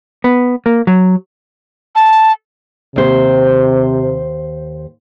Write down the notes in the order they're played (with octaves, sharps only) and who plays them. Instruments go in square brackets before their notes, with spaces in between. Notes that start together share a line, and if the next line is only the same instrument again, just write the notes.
[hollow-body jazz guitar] B3
A#3
F#3
[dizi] A5
[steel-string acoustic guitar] D#2 C5 [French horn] C3